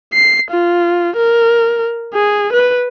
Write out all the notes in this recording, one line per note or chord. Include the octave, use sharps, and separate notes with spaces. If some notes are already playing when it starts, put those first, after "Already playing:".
C7
F4
A#4
G#4
B4